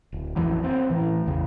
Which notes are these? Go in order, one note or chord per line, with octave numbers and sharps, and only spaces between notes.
D1
A1 F2 E3 F#3
F#3 B3 C4
A2 E3
A1 E2 C#3